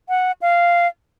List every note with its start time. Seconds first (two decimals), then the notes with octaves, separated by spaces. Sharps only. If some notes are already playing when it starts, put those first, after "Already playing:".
0.09 F#5
0.41 F5